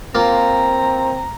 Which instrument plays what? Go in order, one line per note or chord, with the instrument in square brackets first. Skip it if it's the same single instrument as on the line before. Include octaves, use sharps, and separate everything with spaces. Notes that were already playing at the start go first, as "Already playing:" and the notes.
[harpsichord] A#3 F4 [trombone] C4 [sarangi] A#5